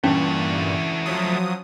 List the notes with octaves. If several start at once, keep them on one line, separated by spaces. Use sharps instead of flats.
G2 A#2 E3 A3 C#4 D4 F#4 A5
F3 F#3 D#6